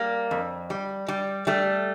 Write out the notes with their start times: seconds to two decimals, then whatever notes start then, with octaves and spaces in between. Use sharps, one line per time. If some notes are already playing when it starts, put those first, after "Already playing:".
Already playing: G3 A#3
0.31 F2
0.70 G3
1.08 G3
1.47 G3 A3